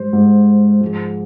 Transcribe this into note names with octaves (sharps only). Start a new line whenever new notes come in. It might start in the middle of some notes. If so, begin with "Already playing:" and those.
Already playing: G#2 G3 C5
G#2 G3
G#2 F3 G#3